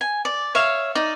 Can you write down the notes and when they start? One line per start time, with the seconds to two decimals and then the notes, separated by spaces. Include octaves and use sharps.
0.01 G#5
0.25 D5
0.55 C#5 E5 F5
0.95 D#4 D5